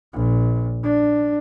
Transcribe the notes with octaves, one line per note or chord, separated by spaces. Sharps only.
A#1
D4